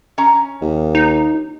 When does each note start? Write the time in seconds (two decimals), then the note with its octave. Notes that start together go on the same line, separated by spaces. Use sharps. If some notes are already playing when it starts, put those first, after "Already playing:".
0.18 C#4 A#5
0.62 D#2
0.95 D#4